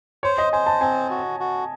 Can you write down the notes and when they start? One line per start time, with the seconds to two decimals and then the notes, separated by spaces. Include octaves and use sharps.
0.23 C5 C#5
0.38 D#5
0.53 C5 G#5
0.66 A5
0.81 C4 G#5
1.11 F#4
1.40 F#4